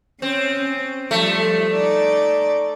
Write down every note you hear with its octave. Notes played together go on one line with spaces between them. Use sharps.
C4 C#4
F3 G3 A3
D#4 D5